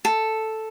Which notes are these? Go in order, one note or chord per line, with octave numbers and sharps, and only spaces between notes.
A4